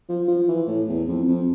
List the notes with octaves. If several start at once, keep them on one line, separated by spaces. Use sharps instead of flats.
F3
F3
E3
A2
E2
F2
F2